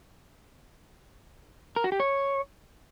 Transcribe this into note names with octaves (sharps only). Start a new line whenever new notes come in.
A#4
F#4
G4
C#5